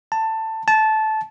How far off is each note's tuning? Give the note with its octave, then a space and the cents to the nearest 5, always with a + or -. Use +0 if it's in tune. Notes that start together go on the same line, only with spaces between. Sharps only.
A5 +15
A5 -15